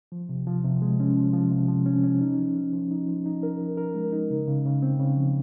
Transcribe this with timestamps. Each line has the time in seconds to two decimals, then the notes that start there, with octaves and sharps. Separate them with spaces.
0.12 F3
0.29 C3
0.47 F3
0.64 C3
0.82 G#3
1.00 C#4
1.17 F3
1.34 F3
1.51 C3
1.68 F3
1.86 C#4
2.04 C#4
2.21 D#4
2.39 F3
2.55 F3
2.73 F3
2.91 D#4
3.08 F3
3.25 D#4
3.43 A#4
3.61 F3
3.77 A#4
3.95 G#3
4.12 D#4
4.30 C#3
4.48 C#3
4.65 C#3
4.82 C4
4.99 C#3
5.16 F3